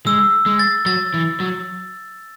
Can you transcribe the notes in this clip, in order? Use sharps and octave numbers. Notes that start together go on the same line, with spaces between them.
G#3 E6
G#3
A6
F#3 A6
E3
F#3